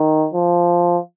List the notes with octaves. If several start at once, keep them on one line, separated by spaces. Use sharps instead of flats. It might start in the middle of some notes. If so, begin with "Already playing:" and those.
Already playing: D#3
F3